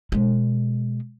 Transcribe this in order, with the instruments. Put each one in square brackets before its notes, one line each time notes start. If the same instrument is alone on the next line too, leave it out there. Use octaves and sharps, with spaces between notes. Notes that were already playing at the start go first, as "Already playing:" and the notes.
[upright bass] B2 G#3